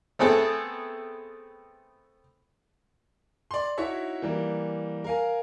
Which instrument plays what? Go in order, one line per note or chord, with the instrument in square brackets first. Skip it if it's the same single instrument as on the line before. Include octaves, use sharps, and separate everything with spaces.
[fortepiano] A3 B3 C4 G#4 A4
[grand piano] D5 C6
D#4 E4 F#4 C#5 E5
E3 G3 A#3
A#4 F5 G#5